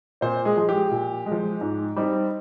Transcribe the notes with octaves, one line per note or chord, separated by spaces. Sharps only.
A#2 C4 C5
G#3 G#4
F3 G#3
G4
A#2
G#3
F3
G#2
G3 C4 D#4